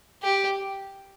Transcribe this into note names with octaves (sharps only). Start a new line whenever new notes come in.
G4